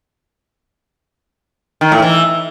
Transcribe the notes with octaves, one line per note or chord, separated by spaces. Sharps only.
D#3
A2
E3